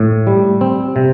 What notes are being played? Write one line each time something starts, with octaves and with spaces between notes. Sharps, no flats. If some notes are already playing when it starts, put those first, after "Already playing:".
Already playing: A2
G3
C4
C3